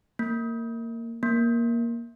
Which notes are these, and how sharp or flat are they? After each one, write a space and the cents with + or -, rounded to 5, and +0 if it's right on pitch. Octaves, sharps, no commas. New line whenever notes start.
A#3 -20
A#3 +10